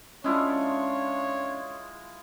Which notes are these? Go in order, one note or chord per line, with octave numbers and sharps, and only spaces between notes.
G#3 C#4 D4 E4 F4 C#5